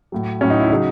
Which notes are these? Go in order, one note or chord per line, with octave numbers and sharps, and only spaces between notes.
A2 F#3
A2 F#3 C#4
D#4
E4
C#3 F#3 D#4